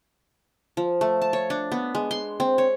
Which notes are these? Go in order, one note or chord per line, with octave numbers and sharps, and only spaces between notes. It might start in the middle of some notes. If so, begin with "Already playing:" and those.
F3
A3
A5
C#5
D4
B3
G#3
C6
C4
C#5